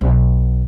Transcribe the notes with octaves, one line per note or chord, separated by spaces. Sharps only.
B1